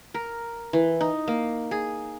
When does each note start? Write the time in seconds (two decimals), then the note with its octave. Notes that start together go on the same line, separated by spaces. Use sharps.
0.14 A#4
0.73 E3
1.01 D#4
1.28 A#3
1.71 G#4